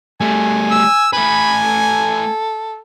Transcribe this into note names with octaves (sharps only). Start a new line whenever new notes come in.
G3 A3 G#5
E6
A3 B4 G#5 B5
A4